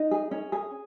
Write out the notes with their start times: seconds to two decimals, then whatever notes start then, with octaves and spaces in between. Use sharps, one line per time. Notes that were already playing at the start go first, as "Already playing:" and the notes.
Already playing: D#4
0.11 G#4
0.31 C#4
0.52 G#4